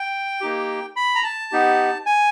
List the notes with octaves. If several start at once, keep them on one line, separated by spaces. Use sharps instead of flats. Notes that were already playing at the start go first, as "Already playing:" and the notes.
Already playing: G5
A#3 D#4 G4
B5
A#5
A5
B3 D#4 G4
G#5